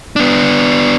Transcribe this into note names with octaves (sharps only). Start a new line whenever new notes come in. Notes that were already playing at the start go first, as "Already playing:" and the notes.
B3 D4